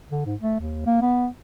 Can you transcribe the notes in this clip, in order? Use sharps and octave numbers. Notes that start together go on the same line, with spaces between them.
D3
G#2
A3
D#2
A#3
B3